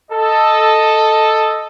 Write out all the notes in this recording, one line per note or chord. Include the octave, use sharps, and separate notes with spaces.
A4 D#5